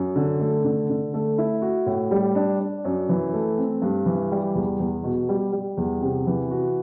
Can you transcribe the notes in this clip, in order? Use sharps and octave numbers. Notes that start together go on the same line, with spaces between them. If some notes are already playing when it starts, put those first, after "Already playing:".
Already playing: F#2
D3
A3
D3
D3
A3
E4
F#4
A2
G3
D4
D4
F#2
E3
A3
C4
G2
E3
G3
E2
E2
B2
G3
G3
E2
C3
E3
F#4